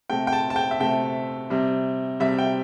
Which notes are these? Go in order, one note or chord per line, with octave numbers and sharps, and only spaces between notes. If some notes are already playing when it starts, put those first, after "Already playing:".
C3 A3 G5
G5
A5
A5
G5
E5
C3 A3 G5
C3 G3
C3 G3 E5
G5